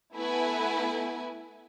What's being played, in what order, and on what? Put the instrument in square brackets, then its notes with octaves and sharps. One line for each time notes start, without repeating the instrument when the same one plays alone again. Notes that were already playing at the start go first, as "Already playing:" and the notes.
[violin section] A3 B3 E4 B4 G#5